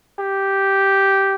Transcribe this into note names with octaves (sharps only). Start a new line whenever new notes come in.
G4